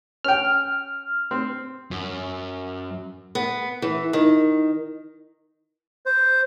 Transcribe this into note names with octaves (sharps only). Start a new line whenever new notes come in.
C#4 G5 F6
C4
F#2
B3
E3
D#3
C5